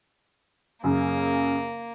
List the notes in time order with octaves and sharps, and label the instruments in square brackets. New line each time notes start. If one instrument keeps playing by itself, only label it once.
[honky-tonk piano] F#2 C#3 [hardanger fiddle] A#3